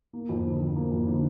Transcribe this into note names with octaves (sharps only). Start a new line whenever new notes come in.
A#3
F2
D3
F2
A#3
F2
D3